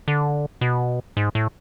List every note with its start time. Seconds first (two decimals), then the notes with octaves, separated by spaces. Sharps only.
0.08 D3
0.61 B2
1.17 G#2
1.35 A2